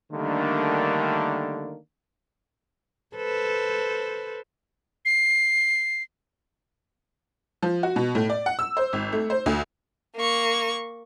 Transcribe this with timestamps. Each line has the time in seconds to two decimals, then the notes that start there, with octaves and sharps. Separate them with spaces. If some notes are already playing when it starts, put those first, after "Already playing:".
0.12 D3 D#3 G3 A3 A#3 D4
3.16 A4 B4 C5
5.05 C7
7.62 F3
7.83 F#4
7.96 B2
8.15 A2
8.30 D5
8.46 F#5
8.59 E6
8.77 C5
8.93 G#1
9.12 A3
9.30 C5
9.46 D2
10.16 A#3 C#6